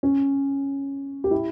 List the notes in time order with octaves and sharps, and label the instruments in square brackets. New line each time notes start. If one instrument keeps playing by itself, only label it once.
[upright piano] C#4
G4
E4